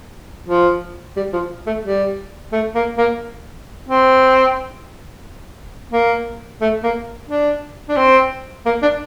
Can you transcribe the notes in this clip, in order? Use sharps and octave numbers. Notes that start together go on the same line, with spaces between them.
F3
G3
F3
A3
G3
A3
A#3
A#3
C4
A#3
A3
A#3
D4
D4
C4
A#3
D4